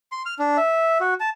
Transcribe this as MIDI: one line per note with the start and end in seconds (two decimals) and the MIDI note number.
0.12 0.23 84
0.26 0.35 89
0.39 0.57 62
0.57 0.98 76
1.00 1.14 66
1.20 1.29 81